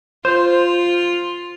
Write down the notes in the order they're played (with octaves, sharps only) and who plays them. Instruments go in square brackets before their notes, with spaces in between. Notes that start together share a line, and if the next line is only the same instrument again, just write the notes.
[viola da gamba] F4 [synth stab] C5